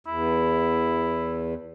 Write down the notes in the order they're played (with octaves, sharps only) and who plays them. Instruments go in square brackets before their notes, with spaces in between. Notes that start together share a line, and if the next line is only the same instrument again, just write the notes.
[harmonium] E2 [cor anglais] E4